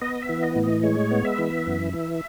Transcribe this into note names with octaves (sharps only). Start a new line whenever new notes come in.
B3 D#5
E5
E3
D#5
A2
D#5
G#3 C#5
B3
E5
E3
F#2
E3